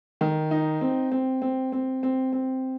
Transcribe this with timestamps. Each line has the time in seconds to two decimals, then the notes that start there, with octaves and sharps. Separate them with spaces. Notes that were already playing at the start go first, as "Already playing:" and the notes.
0.21 D#3
0.51 D#4
0.81 C4
1.12 C4
1.42 C4
1.72 C4
2.03 C4
2.33 C4